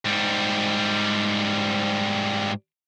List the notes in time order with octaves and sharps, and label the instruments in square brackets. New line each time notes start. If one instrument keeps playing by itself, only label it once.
[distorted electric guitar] G#2 G3